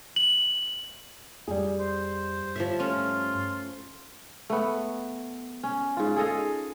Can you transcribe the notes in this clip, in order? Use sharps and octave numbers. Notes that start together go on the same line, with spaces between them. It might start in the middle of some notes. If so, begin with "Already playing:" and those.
F#7
F2 G3 G#4
C5
G2 F3 C#5 E5
A3 C#4 F4
A3 B3
C#4
G#2 F4
G#4 A4 D#5 F5